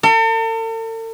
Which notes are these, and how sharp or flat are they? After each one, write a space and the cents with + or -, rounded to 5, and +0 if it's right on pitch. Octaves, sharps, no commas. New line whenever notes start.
A4 +45